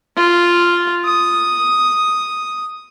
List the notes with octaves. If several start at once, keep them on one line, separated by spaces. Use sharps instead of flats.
F4
D#6